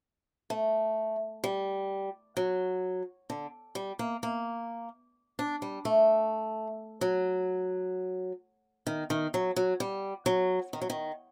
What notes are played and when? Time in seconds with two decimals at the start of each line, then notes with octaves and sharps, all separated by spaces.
0.50 A3
1.44 G3
2.37 F#3
3.30 D3
3.75 G3
3.99 A#3
4.23 A#3
5.39 D4
5.62 G3
5.85 A3
7.01 F#3
8.87 D#3
9.10 D#3
9.34 F#3
9.56 F#3
9.80 G3
10.26 F#3
10.73 D#3
10.82 F#3
10.90 D#3